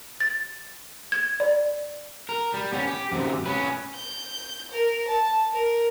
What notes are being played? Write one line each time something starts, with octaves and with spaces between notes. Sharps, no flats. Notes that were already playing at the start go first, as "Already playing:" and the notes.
A6
G#6
D5
A#4
G3
B3 C#4
G4
F#2 C3
C#4 B4
G6
A#4
A5
A#4